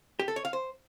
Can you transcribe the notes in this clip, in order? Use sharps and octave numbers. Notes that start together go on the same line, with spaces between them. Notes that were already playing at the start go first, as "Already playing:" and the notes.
G4
A4
C#5
F5
C5